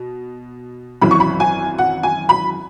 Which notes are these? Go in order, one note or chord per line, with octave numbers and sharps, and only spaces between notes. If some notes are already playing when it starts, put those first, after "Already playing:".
Already playing: B2
G#1 F#2 E3 B5
C#6
B5
G#5
F#5
G#5
B5